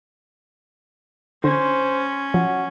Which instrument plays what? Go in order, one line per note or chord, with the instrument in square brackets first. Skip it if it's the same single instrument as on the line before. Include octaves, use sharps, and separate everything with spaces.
[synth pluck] D3 [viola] C#4 [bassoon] C5
[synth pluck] F3 [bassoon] F#3